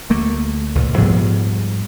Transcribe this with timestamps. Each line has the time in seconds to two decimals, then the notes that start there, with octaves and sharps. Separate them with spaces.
0.10 D2 A3 A#3
0.75 C#2 A#2
0.98 G#2 F3 G3 B3